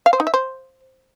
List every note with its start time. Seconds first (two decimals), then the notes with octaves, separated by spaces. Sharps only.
0.06 F5
0.13 C5
0.20 D#4
0.27 E5
0.34 C5